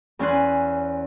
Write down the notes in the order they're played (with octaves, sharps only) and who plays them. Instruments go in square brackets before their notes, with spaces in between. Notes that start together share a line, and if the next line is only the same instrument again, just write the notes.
[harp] E2 C#4 G#5 C6 F#6